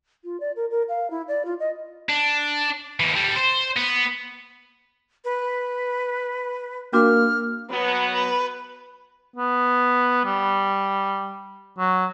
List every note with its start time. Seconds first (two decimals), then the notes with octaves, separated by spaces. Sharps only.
0.24 F4
0.40 D5
0.56 A#4
0.71 A#4
0.89 F5
1.11 E4
1.28 D5
1.45 F4
1.60 D#5
2.09 D4
3.00 D#2 E3
3.13 A2 G3
3.36 C5
3.76 B3
5.24 B4
6.93 A#3 D4 F#4 D6 F6
7.70 F#3 B3 B4
8.14 B4
9.36 B3
10.25 G3
11.79 F#3